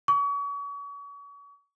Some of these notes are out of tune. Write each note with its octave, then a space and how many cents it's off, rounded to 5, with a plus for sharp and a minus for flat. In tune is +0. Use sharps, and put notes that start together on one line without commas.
C#6 +40